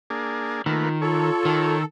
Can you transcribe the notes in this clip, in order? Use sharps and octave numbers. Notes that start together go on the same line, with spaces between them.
A#3 D4 G#4
D#3 A3 A#3 F4 B4
F4 A4 C#5
D#3